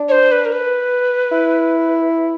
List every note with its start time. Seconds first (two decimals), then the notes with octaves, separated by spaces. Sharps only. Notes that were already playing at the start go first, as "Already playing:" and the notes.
Already playing: D4
0.09 C#5
0.12 C5
0.32 B4
0.45 A#4
0.52 B4
1.32 E4